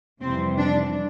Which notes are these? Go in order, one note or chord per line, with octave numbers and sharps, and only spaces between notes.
F2 C3 E3 G3 C4
D4